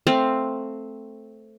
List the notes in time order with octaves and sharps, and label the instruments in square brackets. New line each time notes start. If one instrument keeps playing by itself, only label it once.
[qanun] A3 C4 F5